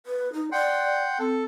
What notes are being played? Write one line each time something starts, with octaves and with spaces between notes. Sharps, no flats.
B4
D#4
D5 F#5 G5 C6
C4 A4